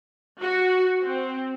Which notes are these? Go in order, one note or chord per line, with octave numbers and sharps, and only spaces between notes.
F#4
C4